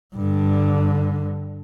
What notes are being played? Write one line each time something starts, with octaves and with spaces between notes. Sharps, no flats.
G2 D3